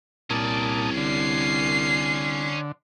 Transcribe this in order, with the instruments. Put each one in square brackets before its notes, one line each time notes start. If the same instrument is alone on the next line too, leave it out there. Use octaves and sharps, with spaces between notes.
[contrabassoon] C2 [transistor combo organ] A#2 A5 D#6 [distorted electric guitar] C#4 D5
[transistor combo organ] D3 [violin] C7